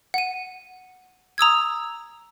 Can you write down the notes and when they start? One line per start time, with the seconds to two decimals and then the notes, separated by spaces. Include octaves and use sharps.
0.14 F#5 D#7
1.38 A#5 D#6 E6 G#6